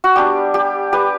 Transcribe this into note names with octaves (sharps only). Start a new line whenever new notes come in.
F#4
G3 B3 D4 G4
G4
G4 B4